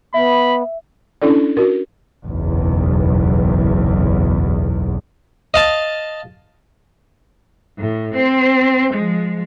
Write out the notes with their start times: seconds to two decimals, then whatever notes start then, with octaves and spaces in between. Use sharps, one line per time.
0.14 B3 E5 B5
1.22 C#4 D4 E4 A4 D5
1.57 F#4 A#4
2.26 F#1 B1 E2
5.54 D#5 F5 A5
7.78 A2
8.15 C4 C5
8.93 F3 G#3